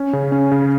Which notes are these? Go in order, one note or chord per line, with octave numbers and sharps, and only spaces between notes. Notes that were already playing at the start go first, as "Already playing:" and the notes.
Already playing: C#4
C#3
C#4
C#3